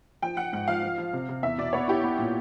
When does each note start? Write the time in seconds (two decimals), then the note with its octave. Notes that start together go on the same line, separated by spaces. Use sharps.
0.22 F3 G5
0.37 F3 F#5
0.53 G#2 F#5
0.68 F3 F5
0.83 F3
0.98 F3
1.13 C3
1.29 C3
1.43 E2 E5
1.58 B2 D5
1.73 B3 C#5
1.88 E4 G4
2.04 B3
2.18 A#2